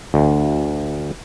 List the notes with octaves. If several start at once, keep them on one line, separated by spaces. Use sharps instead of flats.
D2